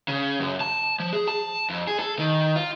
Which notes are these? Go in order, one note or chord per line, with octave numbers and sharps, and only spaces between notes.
C#3
F#2
A5
F3
G#4
A5
F2
G#4
A4
D#3
F4